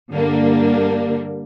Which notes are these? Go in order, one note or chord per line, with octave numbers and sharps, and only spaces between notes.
G2 D3 G3 A#3 D4